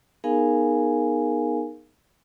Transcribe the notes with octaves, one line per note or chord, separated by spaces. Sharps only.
B3 D#4 G#4 A#4 F5 G#5